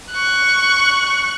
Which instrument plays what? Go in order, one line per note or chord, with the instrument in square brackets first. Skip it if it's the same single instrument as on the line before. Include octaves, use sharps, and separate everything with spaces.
[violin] C#6 F#6